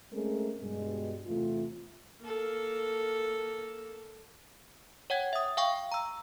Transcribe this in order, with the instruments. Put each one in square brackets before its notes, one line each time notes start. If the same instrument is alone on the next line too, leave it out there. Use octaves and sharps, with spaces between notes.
[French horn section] G#3 A3 C4 C#4 G#4 A#4
G2 B2 G#3
E2 C3 A3 F4
[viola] A#3 A4
[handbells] C#5 F#5 G5 G#6
E5 D#6
F5 G5 C#6
A#5 E6